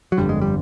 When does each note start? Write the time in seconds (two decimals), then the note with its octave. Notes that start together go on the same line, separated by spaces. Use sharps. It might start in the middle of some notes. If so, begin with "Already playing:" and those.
0.12 F#3
0.17 G1 F2 D3 G3
0.29 G#3
0.41 G3